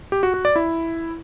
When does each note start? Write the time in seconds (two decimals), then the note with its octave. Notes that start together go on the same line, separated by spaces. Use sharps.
0.12 G4
0.23 F#4
0.34 F#4
0.45 D5
0.56 E4